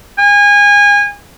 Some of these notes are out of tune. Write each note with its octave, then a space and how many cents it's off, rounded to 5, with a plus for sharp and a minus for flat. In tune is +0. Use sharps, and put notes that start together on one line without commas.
G#5 -30